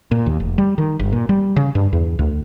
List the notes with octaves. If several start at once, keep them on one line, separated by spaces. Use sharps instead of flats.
A#2
D#2
F1
G3
D#3
G1
A#2
G3
C#3
G2
E2
D2